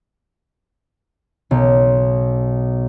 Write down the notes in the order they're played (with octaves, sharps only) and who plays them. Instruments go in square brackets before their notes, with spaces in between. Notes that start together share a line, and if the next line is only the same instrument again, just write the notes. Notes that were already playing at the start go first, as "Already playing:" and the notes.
[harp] B1